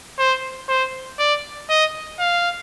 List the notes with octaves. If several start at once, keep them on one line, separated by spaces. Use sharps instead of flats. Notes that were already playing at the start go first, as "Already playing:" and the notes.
C5
C5
D5
D#5
F5